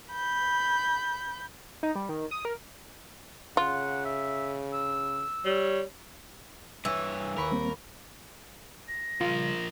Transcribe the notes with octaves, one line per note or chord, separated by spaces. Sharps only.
B5 G6
D#4
G3
D#3
D#6
A#4
C#3 F4 F#5
E5
E6
G3 C#5
G2 E3 C#5
D#2 A#4 B5 C#6
G3 A#3 C4
A#6
C#3 F3 G3 F4 A#4